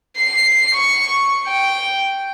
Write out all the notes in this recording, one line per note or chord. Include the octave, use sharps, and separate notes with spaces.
C7
C#6
G5